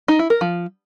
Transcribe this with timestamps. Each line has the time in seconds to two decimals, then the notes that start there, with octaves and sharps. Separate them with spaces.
0.08 D#4
0.19 E4
0.30 A#4
0.41 F3